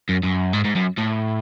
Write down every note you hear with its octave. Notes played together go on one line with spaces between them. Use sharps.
F#2
F#2
G#2
G#2
F#2
A2